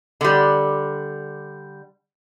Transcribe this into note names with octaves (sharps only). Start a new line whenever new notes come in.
D3 G3